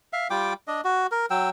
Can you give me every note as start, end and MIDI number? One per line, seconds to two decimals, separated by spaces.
0.13 0.28 76
0.13 0.28 77
0.30 0.53 55
0.30 0.53 65
0.30 0.53 79
0.30 0.53 86
0.67 0.81 62
0.67 0.81 75
0.84 1.07 66
1.11 1.26 70
1.30 1.50 54
1.30 1.50 79
1.30 1.50 88